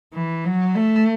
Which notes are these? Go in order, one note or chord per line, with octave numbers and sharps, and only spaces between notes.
E3
F#3
A3